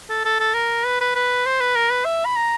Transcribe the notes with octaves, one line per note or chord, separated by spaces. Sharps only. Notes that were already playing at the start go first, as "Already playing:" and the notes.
A4
A4
A4
A#4
B4
B4
B4
C5
B4
A#4
B4
E5
B5
A#5